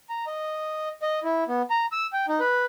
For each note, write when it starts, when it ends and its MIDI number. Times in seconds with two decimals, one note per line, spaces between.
0.09 0.25 82
0.27 0.89 75
1.02 1.20 75
1.24 1.44 64
1.48 1.62 59
1.70 1.86 82
1.92 2.07 88
2.13 2.26 79
2.28 2.40 63
2.40 2.65 71